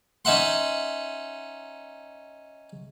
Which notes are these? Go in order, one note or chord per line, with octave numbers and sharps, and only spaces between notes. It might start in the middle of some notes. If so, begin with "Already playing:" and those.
C#4 D#4 E5 F#5 C6